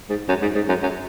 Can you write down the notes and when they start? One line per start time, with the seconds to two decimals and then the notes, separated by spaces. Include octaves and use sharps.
0.10 G#2
0.29 F#2
0.42 G#2
0.55 G#2
0.69 F#2
0.83 F#2